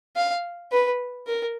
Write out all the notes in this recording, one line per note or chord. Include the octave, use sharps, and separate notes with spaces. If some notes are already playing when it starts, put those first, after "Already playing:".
F5
B4
A#4